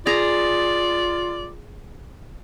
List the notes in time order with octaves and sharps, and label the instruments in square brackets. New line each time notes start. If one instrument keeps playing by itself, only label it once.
[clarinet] F4 [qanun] G#4 A#5 [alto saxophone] D5